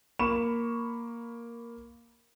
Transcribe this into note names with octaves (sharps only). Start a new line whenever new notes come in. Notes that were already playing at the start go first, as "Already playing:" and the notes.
A#3 B5 C#6 E7